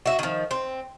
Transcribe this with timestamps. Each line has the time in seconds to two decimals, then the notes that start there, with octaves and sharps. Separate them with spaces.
0.06 F#4 E5
0.19 D#3 F3
0.51 C4